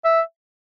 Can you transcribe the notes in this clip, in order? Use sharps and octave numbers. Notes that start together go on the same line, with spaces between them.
E5